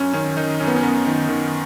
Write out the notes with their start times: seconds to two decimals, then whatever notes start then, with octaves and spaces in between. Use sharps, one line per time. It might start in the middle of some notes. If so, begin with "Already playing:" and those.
Already playing: F#2 C#4
0.13 D#3 C#4
0.37 D#3 D#4
0.60 F#2 C#4
0.67 B3
0.76 C#4
0.83 F#2 B3
1.06 D#3
1.29 D#3